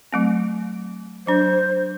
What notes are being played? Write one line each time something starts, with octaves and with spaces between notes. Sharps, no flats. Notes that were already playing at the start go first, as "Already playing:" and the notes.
F#3 A3 C4
F#3 D4 C5